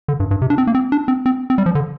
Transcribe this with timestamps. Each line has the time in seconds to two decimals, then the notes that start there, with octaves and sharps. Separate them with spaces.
0.08 D3
0.20 G2
0.31 G2
0.42 C3
0.50 D4
0.58 C4
0.67 A#3
0.75 C4
0.92 D4
1.08 C4
1.26 C4
1.50 C4
1.58 G3
1.66 F3
1.75 D3